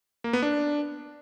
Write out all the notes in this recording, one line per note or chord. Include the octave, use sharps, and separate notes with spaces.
A#3
B3
D4